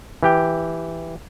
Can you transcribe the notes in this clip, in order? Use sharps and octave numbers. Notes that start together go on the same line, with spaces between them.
E3 G4 G5